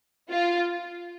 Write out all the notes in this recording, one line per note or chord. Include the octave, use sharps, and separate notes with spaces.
F4